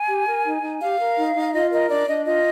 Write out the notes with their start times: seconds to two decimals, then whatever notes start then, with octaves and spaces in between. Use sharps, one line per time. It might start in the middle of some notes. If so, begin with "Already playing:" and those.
Already playing: G#5
0.09 G4
0.28 A#4
0.45 D#4
0.63 D#4
0.81 G4 F5
1.00 A#4
1.18 D#4
1.36 D#4
1.53 F4 D#5
1.71 A#4 D#5
1.90 D4 D5
2.08 D4 D#5
2.26 F4 D#5